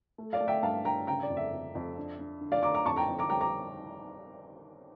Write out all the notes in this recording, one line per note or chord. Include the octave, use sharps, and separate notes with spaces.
A3
D5 F5
A3
E5 G5
G2 F5 A5
G2 G5 A#5
C#3 G5 A#5
D5
F2
E5
F2
F2
D4
D4
D3
D5 F5
D3 A#5 D6
A#5 D6
F2 A5 C#6
G5 A#5
F2
A#5 D6
G3 G5 A#5
A#5 D6